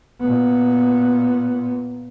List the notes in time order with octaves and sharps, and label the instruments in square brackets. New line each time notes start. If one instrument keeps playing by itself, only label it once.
[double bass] A#2 B3